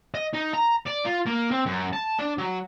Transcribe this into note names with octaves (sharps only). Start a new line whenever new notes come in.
D#5
D#4
A#5
D5
F4
A#3
C4
F#2
A5
D4
F#3